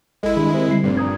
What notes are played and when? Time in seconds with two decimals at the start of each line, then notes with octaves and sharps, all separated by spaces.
0.23 G#1 G#3 E4 A4 D#5
0.36 G2 D#3 G#4 B5
0.54 C3 A#4 C5
0.69 D3 G3 C7
0.83 F1 G2 A#2
0.97 A#5 D#6 G#6